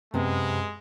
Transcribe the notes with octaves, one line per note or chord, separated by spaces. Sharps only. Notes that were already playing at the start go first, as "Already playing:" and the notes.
F#2 C3 G#3 B3